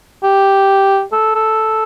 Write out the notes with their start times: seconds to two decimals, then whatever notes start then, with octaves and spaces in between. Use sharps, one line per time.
0.23 G4
1.12 A4
1.35 A4